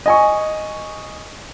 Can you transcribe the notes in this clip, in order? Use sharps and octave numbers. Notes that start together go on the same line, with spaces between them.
D#5 G#5 C#6